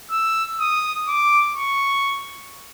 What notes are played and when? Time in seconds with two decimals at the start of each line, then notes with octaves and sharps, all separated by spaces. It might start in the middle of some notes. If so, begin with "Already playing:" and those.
0.11 E6
0.60 D#6
1.08 D6
1.56 C#6